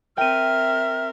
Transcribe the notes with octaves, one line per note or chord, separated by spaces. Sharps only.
C4 A#4 E5 G5 F6 D#7